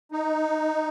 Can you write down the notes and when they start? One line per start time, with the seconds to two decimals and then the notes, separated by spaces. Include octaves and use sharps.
0.12 D#4